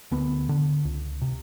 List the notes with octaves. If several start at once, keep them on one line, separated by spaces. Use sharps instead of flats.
D2 B3
D3
C#2
C3